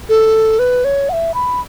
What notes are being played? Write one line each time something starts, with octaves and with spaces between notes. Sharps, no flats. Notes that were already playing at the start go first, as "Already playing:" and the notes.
A4
B4
C#5
F#5
E5
B5